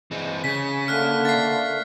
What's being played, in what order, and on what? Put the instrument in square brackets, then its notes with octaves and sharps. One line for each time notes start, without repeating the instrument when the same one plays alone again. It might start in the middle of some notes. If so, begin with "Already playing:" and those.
[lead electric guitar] E3 C4 [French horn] G#3
[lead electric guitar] C#3 [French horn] G#4 [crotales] B6
[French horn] D3 [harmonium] A3 A#3 [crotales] F6 F#6 B6
[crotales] A6 C7